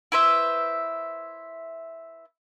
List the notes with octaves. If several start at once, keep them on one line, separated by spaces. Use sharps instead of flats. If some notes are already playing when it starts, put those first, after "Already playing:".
E4 B4 C5 E5